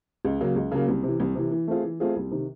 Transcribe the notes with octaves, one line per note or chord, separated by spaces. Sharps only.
C#2
C#3 F#3 A#3
C#2
C#3 F#3 A#3
C2
C3 E3
C2
C3 E3
E3
A3 C4 F4 G#4
E3
A3 C4 F4 G#4
C2
C3 D#3